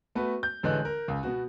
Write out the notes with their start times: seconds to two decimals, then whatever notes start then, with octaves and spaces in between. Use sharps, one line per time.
0.15 A3 B3 F#4 B4
0.43 G6
0.63 A1 D3 E3 G#3 F#6
0.85 A#4
1.08 C#2
1.23 B2 B3 F#4